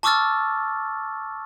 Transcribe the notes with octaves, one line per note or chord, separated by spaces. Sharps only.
A5 C#6 D6 E6 F6 A6